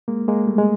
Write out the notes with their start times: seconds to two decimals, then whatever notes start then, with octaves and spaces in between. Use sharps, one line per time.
0.08 G#3 A#3
0.28 G#3 A#3
0.47 G3 A3
0.58 G#3